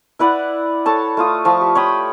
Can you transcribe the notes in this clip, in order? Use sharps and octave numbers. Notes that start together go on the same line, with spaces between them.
E4 B4 D5 F#5
A4 C#5 A5
A3 F4 D#6
F3 A5 C#6
G4
C#5 G5 B5 D#6